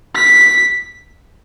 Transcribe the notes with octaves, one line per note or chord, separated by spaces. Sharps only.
B6